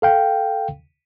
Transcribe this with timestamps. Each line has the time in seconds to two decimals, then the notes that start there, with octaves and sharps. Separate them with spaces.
0.02 A4 F5 G5